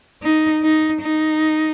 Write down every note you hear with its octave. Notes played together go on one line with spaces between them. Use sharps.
D#4
D#4
D#4